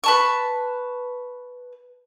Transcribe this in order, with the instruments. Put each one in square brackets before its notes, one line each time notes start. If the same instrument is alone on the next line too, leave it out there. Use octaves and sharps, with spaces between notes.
[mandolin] B4 A5 C#6